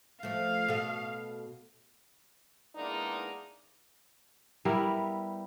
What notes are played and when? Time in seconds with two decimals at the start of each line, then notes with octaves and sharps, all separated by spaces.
0.23 F3 A3 F5
0.68 B2 A4
2.76 E3 G#3 A#3 B3 D4 D#4
4.65 G3 B3 E4 A#4